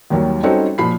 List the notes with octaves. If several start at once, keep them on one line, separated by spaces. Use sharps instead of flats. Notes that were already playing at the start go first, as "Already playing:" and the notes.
D#2 D#3 F#3 G3 A#3
G3 C4 C#4 D#4 F#4 A4
A#2 F3 B5 C7